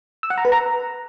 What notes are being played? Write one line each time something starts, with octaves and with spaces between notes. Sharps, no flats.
E6
F#5
A#5
B4
A#5